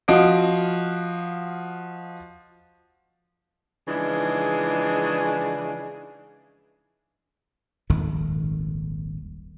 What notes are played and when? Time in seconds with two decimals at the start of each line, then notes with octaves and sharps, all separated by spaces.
0.08 F3 F#4 D#5 F5 D7
3.88 C#3 E3 F3 G#3 D4 D#4
7.89 D#1 G#1 F2 D#3